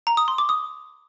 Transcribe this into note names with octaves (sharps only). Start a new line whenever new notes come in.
A#5
D#6
C6
D6
D#6